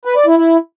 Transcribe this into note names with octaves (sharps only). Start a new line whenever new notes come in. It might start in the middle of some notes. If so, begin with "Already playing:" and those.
B4
D5
E4
E4